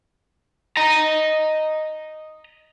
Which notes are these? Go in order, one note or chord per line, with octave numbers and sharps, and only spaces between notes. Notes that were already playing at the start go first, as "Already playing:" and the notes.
D#5 A#5